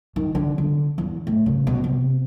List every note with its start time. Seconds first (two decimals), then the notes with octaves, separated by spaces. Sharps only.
0.16 D#3
0.35 D3
0.58 D3
0.98 E2
1.27 A2
1.46 C#3
1.67 B2
1.84 C3